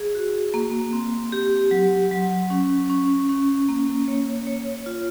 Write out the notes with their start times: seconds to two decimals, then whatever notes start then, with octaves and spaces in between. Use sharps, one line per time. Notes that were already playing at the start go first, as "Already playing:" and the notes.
Already playing: G#4
0.15 F#4
0.54 A#3
0.93 C4
1.32 G4
1.71 F#3
2.11 F#3
2.50 C#4
2.90 C#4
3.29 C#4
3.69 A#3
4.08 C#5
4.47 C#5
4.86 F4